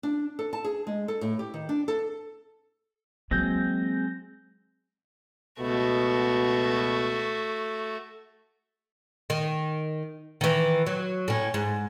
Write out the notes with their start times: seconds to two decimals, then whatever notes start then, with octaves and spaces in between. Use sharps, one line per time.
0.03 D4
0.39 A4
0.53 A5
0.64 G#4
0.87 G#3
1.08 A4
1.21 A2
1.39 G4
1.54 D#3
1.69 D4
1.88 A4
3.31 E3 F#3 G#3 A#3 C4 G6 A#6
5.60 C#2 B2 A3 F#4
9.30 D#3
10.41 D#3 E3
10.86 F#3
11.28 A2 C#4
11.54 G#2